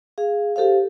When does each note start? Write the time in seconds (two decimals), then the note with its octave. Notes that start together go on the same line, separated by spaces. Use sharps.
0.18 G#4 F5
0.56 G4 A4 C5 F5